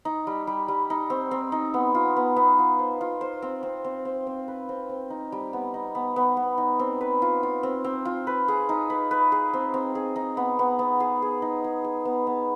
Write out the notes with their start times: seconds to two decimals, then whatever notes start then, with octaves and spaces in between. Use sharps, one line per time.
0.05 D#4
0.27 G3
0.47 G3
0.68 G3
0.90 D#4
1.10 C4
1.31 C4
1.52 D#4
1.74 B3
1.95 F4
2.16 B3
2.36 B3
2.59 F4
2.79 C5
3.01 F4
3.21 C5
3.42 C4
3.63 C4
3.84 C4
4.05 C4
4.27 C4
4.48 B4
4.69 C4
4.89 C4
5.10 D#4
5.32 G3
5.53 B3
5.74 D#4
5.95 B3
6.16 B3
6.37 B3
6.58 D#4
6.79 C4
7.01 B4
7.22 F4
7.43 F4
7.63 C4
7.84 C4
8.05 F4
8.27 B4
8.48 G#4
8.69 D#4
8.90 B4
9.11 B4
9.32 G#4
9.54 C4
9.74 C4
9.95 G#4
10.16 D#4
10.37 B3
10.59 B3
10.79 B3
11.00 G#4
11.22 G#4
11.42 D#4
11.64 G#4
11.84 G#4
12.05 B3
12.27 B3